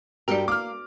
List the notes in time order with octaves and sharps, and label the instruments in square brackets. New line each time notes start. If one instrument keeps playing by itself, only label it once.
[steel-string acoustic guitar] G2 G4 G5 [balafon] F#4 D5 [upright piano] A#4
[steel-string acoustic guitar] A#3 [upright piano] D6 F6